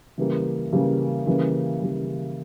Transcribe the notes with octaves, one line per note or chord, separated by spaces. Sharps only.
C#3 E3 G3 A#3
C#3 E3 G3 A#3
C#3 E3 G3 A#3
C#3 E3 G3 A#3